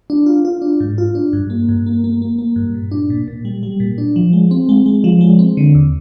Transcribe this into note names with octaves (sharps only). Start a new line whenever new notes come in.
D4
F4
F4
D4
G#2
F4
D4
G2
A#3
G2
A#3
A#3
A#3
A#3
G2
A#2
D4
A#2
A#2
G3
G3
A#2
D4
F3
G#3
C4
G#3
G#3
F3
G#3
C4
D3
D#2